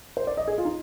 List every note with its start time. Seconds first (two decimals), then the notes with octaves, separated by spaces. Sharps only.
0.17 C5
0.27 D5
0.37 D#5
0.48 G#4
0.58 F4
0.65 D#4